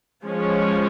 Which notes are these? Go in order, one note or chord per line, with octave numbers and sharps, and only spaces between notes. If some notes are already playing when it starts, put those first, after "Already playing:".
F3 G#3 C#4